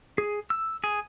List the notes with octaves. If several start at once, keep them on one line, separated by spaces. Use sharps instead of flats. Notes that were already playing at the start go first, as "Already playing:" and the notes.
G#4
E6
G#4